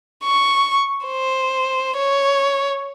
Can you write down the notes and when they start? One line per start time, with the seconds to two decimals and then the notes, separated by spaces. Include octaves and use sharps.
0.24 C#6
1.06 C5
1.97 C#5